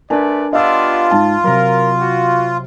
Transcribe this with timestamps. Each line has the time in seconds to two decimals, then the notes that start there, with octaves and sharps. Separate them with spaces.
0.10 A3 D4 A#4 B4 D5 G#5
0.53 B3 D4 F4 G4 D#5 E6
1.11 G#2 A5
1.44 C3 F#3 A#4
1.99 F#4